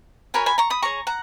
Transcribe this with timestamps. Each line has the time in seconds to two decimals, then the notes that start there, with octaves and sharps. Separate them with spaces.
0.34 F#4 A#4 C#5 G#5 B5
0.46 G#5 B5
0.58 A#5 C#6
0.70 B5 D#6
0.82 G#4 C#5 A#5 C#6
1.07 F#5 A#5